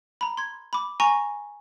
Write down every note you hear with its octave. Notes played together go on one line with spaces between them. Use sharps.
A#5 B5
C6 G#6
B5 D6
G#5 A#5 C#6 A#6